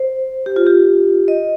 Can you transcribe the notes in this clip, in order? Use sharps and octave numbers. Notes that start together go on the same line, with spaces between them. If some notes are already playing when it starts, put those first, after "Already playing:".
Already playing: C5
G4
F4
G4
D#5